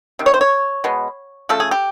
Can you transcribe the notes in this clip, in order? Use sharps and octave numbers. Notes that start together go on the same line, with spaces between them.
C3 D#3
C#5
C5
C#5
B2 G#3 B3
C#3 F3 A3 A4
G#4
G4